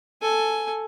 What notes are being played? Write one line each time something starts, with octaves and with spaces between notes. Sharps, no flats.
A4 G#5